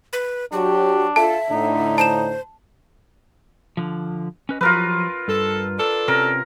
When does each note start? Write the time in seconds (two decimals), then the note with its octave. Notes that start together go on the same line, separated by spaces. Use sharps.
0.13 B4
0.52 F#3 D4 F#4 G4
1.16 F4 A4 E5 A5
1.51 A2 D3 D#4
1.98 C5 A5 E7
3.77 D3 F3
4.49 C#4 B4 D#5
4.61 F3 F#3 F4 G4 A#4 B4
5.28 G2 A4
5.79 D4 A4
6.08 C3 C#4 A#4